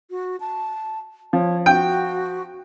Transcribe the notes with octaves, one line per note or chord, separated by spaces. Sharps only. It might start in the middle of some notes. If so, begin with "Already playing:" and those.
F#4
A5
F3 C#5
F#4 G5